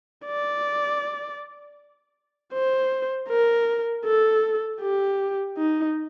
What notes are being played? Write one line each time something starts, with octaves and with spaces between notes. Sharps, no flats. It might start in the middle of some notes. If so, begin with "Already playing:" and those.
D5
C5
A#4
A4
G4
D#4